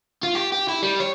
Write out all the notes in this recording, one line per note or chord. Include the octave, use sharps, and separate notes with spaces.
F4
G4
G4
E4
G3
C#5